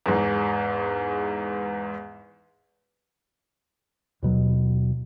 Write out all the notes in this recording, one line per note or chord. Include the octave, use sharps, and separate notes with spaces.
E2 G#2
D#2 B2 F#3